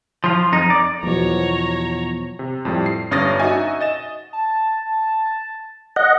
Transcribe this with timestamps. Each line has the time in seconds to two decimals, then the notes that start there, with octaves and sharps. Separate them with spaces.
0.24 F3 F4
0.52 F2 D#4
0.70 D5
1.03 E2 B2 F3 F#3 C#5 A#5
2.39 C3
2.65 F2 A2 G3
2.86 C7
3.11 G1 G2 C#4 D#6 A6 A#6
3.40 D#4 F#4 D#5 E5 G#5
3.81 D#5 A6 E7
4.33 A5
5.96 D#5 F#5